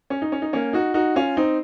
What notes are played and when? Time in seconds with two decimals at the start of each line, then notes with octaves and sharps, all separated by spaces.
0.10 C#4
0.22 D#4
0.32 C#4
0.42 D#4
0.53 A#3 C#4
0.73 D#4 F#4
0.94 D#4 F#4
1.15 C#4 F4
1.37 C4 D#4